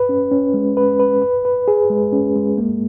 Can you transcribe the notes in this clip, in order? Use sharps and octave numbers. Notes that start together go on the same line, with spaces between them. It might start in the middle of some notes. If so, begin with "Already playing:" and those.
Already playing: B4
C#4
C#4
G#3
B4
B4
B4
B4
G#4
G#3
C#4
G#3
A#3